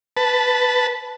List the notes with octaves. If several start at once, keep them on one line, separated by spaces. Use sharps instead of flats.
B4 A5